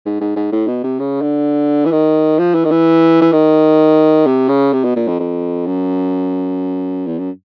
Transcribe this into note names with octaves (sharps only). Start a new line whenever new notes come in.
G#2
G#2
G#2
A2
B2
C3
C#3
D3
E3
D#3
F3
E3
D#3
E3
E3
D#3
C3
C#3
C3
B2
A#2
F2
F2
F#2
E2
F#2